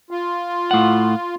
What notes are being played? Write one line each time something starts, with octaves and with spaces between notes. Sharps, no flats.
F4
A2 F#5